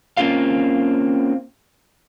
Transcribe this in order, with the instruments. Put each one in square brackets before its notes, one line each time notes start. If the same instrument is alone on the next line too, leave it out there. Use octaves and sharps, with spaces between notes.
[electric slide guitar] A#3 C4 C#4 F4 G4 F5